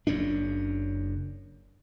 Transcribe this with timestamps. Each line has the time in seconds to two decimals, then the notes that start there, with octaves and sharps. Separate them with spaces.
0.07 F#1 F#2 C#3 D4